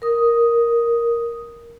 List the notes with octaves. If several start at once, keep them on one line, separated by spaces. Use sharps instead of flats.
A#4 D#6